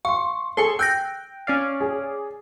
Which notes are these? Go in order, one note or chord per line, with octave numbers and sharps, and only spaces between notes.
F5 C6 C#6
G#4 A4 C6 C#6
G5 E6 F#6 G6 A#6
C#4 D5 F5
G#4